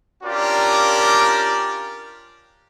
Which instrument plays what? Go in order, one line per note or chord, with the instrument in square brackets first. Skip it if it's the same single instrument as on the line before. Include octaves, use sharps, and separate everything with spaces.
[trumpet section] C#4 D4 F4 G4 A#4 D5